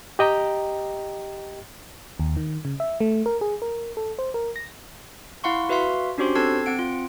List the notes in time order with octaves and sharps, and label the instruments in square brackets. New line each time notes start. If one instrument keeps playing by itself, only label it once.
[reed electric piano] G4 D#5 G5 A#5
[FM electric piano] D#2
D#3
C#3
E5
A3
A#4
G#4
A#4
A4
C5
A#4
A#6
[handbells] E4 F5 F#5 C6 C#6
F#4 B4 E5 F5 C6
C#4 D4 F#4 G4 C5 C6
C4 A4 A5 E6 G#6 C7
C4 F#5 D7
F4